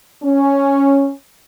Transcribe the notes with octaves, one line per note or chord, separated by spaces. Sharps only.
C#4